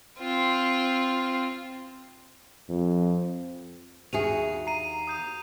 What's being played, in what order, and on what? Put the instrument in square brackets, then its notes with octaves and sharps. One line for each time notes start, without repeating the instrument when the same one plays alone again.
[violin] C4 F4
[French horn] F2
[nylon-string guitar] D#2 F#4 G#4 [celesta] E5 D#7 [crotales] F7
[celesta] A#5 [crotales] C7 D#7
[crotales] D#6 G6 D#7